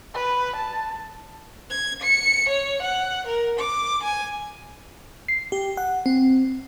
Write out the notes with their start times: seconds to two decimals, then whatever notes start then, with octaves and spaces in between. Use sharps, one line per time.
0.14 B4
0.56 A5
1.70 G#6
2.02 C#7
2.49 C#5
2.82 F#5
3.27 A#4
3.59 D6
4.03 G#5
5.28 C7
5.52 G4
5.77 F#5
6.06 C4